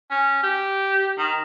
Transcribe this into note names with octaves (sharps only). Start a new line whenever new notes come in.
C#4
G4
D#3